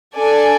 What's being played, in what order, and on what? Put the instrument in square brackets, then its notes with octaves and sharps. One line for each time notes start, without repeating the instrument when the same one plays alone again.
[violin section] D4 A4 D5 G#5